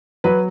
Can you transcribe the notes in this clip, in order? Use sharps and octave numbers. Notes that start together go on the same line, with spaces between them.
F#3 B4